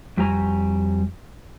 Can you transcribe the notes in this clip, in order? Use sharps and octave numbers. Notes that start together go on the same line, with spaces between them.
F2 G3 F#4 G4 G#5 A#5